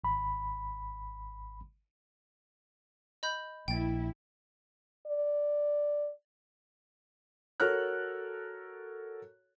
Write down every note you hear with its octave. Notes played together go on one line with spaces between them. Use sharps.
G#1 B5
D#5 B5 G6
A#1 A#3 E4 G5 A6
D5
F#4 A4 A#4 C#5 F6 F#6